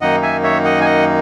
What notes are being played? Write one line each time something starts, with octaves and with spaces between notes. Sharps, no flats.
F#2 D#3 A#3 D#4 D#5 F#5
E5 G#5
C#5 E5
D#5 F#5
G#5
D#5 F#5